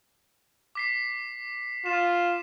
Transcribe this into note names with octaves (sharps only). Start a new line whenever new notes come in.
D6 B6 C7
F4 E7